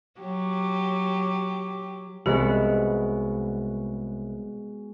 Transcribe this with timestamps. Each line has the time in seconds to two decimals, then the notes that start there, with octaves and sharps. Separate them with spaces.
0.20 F#3 G4
2.26 C2 G#3 B3 F#4 G4